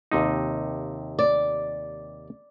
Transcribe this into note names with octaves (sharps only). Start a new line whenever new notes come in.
D#2 C3 D#4
D5